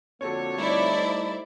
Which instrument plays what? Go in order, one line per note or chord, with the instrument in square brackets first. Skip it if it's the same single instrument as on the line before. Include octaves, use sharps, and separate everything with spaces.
[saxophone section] F2 D3 C#5 [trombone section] A#3 F#4 A4
[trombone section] G3 A3 D#4 [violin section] E4 C5 D5